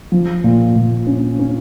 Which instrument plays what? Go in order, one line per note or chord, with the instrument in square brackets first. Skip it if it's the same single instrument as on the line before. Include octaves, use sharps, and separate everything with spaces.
[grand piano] F3
A#2
A#2
C#4
C#4